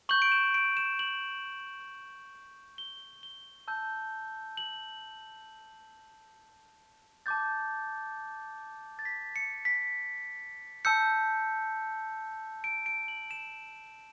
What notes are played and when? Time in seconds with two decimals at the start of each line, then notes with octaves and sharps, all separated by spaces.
0.09 C#6 G6 F#7
0.22 D7
0.32 E7
0.54 D7
0.77 E7
0.99 F#7
2.78 G7
3.23 G7
3.68 A5 E6 G6
4.57 F#7
7.26 A5 D6 G6 A6
8.99 A6
9.05 B6
9.36 C#7
9.65 B6
10.85 A5 E6 G6 C#7
12.64 D7
12.86 D7
13.08 F#7
13.31 E7